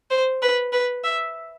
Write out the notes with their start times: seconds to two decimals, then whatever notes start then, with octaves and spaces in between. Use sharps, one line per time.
0.10 C5
0.42 B4
0.72 B4
1.04 E5